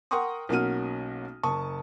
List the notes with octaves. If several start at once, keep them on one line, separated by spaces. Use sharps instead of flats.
A#4 F#5 G5 C6 C#6 D#6
B1 A#3 C#4 F#4 F6 D#7
F#1 A5 C#6 D#6